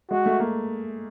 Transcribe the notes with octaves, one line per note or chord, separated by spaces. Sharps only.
G#3 F#4
A3
A#3